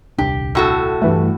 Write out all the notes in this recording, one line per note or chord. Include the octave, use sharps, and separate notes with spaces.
D#1 C2 D4 G4
A2 F#4 A4
G2 E3 A3